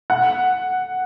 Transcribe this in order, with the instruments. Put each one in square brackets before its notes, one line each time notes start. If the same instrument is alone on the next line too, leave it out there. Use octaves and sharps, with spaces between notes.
[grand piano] F#5